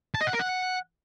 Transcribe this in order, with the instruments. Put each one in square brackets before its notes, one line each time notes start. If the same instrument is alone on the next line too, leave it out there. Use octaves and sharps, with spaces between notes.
[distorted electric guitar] A5
D#5
F#5
A#4
F#5